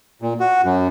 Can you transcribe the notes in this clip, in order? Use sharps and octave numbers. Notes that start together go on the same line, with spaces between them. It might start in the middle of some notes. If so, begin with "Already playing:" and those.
A#2
F#4
F#2